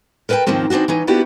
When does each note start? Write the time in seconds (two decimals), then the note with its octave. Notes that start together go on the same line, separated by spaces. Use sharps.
0.29 A#4 B4 D#5 F#5 G5 A5
0.47 D#2 G#2 D#3 F3 A#3 C4
0.70 E3 C4 D4 D#4 F#4
0.88 E3 C#4 D#4
1.07 A#3 B3 D4 E4 F#4 G4